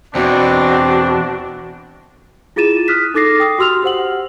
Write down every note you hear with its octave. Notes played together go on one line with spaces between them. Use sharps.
E2 B2 C4 D4 F#4
E4 F4 G#4 A6 D#7 E7
D#6 F6 F#6 B6
D#4 A4 D6 A6 A#6 C7
G5 D#6
F#4 G4 C6 E6 F6 F7
G4 C5 F#5 F#7